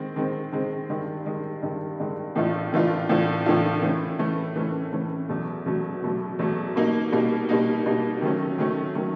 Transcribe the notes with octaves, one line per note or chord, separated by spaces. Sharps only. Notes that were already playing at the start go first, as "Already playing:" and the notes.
Already playing: D#3 G#3 C4
D#3 G#3 C4
D#3 G#3 C4
G2 D#3 G#3
G2 D#3 G#3
G2 D#3 G#3
G2 D#3 G#3
A2 E3 A3 D4 F4
A2 E3 A3 D4 F4
A2 E3 A3 D4 F4
A2 E3 A3 D4 F4
E3 A3 C#4
E3 A3 C#4
E3 A3 C#4
E3 A3 C#4
E2 B2 F#3 A3
E2 B2 F#3 A3
E2 B2 F#3 A3
E2 B2 F#3 A3
B2 G3 A#3 D#4
B2 G3 A#3 D#4
B2 G3 A#3 D#4
B2 G3 A#3 D#4
D#3 F#3 A3 C#4
D#3 F#3 A3 C#4
D#3 F#3 A3 C#4